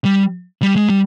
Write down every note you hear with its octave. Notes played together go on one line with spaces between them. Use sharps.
G3
G3
G#3
G3